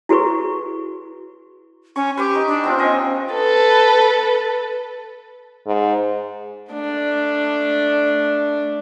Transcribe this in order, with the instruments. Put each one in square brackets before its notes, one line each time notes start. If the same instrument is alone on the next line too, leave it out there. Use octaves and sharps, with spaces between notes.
[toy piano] E4 F#4 G#4 B4 C#6
[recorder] C#4 [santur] C#6
[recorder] G4 [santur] B4 C#6 D6
[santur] D#4
[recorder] D4
[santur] B3 C4 F4
[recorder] C#4 [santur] C5 D#5
[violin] A4 B4
[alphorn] G#2
[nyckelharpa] A3 D4